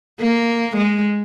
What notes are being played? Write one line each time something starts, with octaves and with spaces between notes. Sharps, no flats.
A#3
G#3